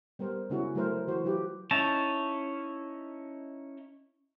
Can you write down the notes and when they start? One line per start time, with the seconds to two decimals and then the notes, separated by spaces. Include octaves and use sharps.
0.19 G3 B3 A#4 C5
0.50 C#3 G#3 B3 C#4 E4 F#4
0.75 F#3 A3 E4 A#4 C5
1.08 E3 F#4 C5
1.24 F#3 E4 F4 G4 B4
1.71 C#4 D#4 E4 A5